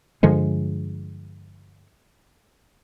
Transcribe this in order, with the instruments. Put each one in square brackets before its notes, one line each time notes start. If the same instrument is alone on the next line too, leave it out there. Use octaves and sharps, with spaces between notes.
[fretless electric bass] G2 D3 F3 G#3